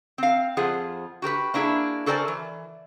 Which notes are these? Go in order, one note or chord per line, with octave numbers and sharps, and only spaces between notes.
C4 F5
F2 F4 G#4 C5 F#5
F#4 G4 A#4 B4
A#3 D4 E4 F#4 G#4
F#4 A4 A#4 C5 D5 G#5
E3